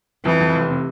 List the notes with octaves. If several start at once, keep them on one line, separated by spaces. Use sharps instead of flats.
F2 E3
F2
F1
C3